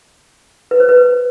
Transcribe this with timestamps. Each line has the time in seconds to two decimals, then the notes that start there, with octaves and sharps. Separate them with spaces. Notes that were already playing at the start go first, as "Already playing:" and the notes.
0.71 B4
0.80 C5
0.89 B4